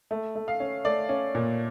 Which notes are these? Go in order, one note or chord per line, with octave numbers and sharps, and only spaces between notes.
A3
A3
F5
C#4
A3 D5
C#4
A#2